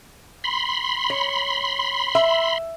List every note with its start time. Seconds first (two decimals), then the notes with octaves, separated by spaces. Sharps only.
0.44 B5 C6
1.10 C#5
2.15 E5